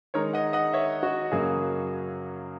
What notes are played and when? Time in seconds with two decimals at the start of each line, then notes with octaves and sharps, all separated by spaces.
0.14 D#3 G#3 D#4 A#4 C#5
0.33 D#5 F#5
0.53 D#5 F#5
0.73 C#5 E5
1.03 F#4
1.32 F#2 C#3 F#3 A#3 G#4